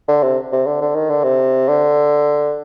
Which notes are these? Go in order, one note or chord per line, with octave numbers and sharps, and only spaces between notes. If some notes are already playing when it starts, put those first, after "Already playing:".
D3
C3
C3
D3
D3
D#3
D3
C3
D3